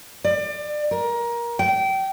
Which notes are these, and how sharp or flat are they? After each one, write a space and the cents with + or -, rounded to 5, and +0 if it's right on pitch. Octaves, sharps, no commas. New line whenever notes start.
D5 +30
A#4 +20
G5 -25